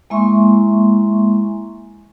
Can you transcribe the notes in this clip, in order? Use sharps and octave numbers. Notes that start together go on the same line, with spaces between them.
G#3 A#3 E4 E5 C6 C#6